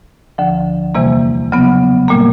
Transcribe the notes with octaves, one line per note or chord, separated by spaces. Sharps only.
D2 D3 F3
E2 C3 E3 G3 A#3
C#3 F#3 B3
A#2 G3 A#3